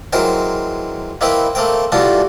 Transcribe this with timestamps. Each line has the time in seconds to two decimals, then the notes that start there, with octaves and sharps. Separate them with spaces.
0.13 E3 F#3 G#3 A#4 C5 G5
1.21 A#3 C4 D#4 E4 B4 G5
1.55 A3 A#3 C4 G5
1.92 E3 G3 A3 D4 F4 F#4